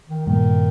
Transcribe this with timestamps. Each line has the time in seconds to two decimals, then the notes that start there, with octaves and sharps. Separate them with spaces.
0.08 D#3
0.27 G2 A#2 D#3